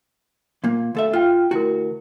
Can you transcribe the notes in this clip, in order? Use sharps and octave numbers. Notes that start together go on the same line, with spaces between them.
A#2 A#3
D2 A4 E5
F4 G5 F6
D2 E4 F#4 A#4